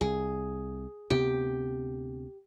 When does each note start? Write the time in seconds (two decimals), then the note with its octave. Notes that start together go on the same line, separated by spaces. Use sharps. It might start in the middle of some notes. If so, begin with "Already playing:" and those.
0.01 C2 G#4
1.10 D2 C3 B3 G4